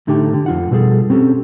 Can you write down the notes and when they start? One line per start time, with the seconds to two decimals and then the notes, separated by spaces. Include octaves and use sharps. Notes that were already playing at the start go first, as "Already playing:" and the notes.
0.07 A2 D3 A3 D#4 G4 G5
0.34 D3
0.46 F2 F4 F#5
0.71 B2 F#3 G3 A3 G#4 A4
1.10 C4 C#4 G4 A4